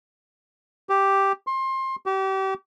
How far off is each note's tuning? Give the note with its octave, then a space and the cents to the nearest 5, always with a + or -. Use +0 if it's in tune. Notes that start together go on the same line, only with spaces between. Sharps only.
G4 +0
C6 +25
G4 -35